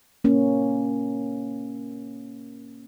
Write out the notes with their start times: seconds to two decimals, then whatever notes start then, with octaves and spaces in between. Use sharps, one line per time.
0.24 A#3 C#4